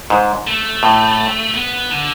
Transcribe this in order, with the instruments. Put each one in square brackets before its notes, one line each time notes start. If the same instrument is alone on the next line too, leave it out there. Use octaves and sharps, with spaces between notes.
[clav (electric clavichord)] G#2
[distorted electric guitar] A3
[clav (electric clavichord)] A2
[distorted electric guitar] B3
D3